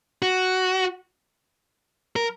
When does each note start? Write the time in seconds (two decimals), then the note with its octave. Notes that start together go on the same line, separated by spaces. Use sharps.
0.22 F#4
2.16 A#4